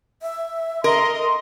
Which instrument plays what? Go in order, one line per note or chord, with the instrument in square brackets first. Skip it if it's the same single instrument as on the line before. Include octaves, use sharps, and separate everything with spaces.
[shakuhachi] E5
[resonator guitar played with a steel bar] A#4 [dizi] D#5 [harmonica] C6